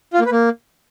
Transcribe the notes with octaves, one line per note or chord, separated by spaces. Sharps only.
F4
A#3
B4
A#3